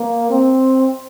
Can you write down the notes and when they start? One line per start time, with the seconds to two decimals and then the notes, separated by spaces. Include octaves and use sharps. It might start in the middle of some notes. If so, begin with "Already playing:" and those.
Already playing: A#3
0.31 C4